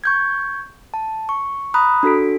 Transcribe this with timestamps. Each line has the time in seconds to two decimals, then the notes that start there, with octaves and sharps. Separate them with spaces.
0.04 C#6 G6 G#6
0.94 A5
1.29 C#6
1.74 A#5 B5 D#6 F#6
2.03 D4 F#4 A4 B6 D7